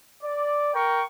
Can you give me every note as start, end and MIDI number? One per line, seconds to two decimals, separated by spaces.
0.23 0.70 74
0.73 1.03 70
0.73 1.03 79
0.73 1.03 85